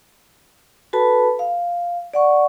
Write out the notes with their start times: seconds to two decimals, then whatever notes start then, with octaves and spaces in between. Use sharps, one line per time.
0.93 F#4 A4 B4 A5 B5
1.39 F5
2.14 D5 F#5 C#6